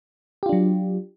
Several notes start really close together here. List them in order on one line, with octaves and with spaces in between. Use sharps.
G4 F4 D4 F#3